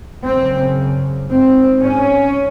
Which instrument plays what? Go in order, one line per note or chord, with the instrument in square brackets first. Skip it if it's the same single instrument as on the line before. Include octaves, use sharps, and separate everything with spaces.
[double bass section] F#2 C#3 C4
G#2 C4
C#4